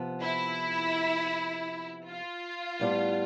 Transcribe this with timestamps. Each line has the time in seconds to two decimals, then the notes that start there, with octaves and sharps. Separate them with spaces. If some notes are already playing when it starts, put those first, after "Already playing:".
Already playing: C3 F3 B3
0.21 E4
2.06 F4
2.80 A2 G3 B3